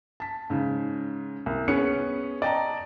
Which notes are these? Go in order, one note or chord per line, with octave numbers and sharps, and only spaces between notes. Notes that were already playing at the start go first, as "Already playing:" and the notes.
A5 B6
G#2 C#3
C2
B3 C#4 G#4 B4 C#7
D5 D#5 G5 A5 A#5